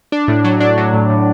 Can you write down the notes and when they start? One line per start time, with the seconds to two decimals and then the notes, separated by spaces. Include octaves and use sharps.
0.12 D4
0.28 A2
0.44 F#3
0.60 D4
0.78 F#3
0.93 A2
1.10 A2